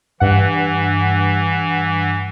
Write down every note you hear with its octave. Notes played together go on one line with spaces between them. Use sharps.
G2 E3 F#5